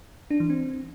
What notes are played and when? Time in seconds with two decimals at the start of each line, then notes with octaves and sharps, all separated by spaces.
0.31 D4
0.40 E3
0.50 C4